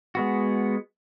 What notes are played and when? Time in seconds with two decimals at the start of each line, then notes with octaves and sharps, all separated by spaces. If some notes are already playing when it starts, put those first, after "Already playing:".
0.15 G#3 B3 F#4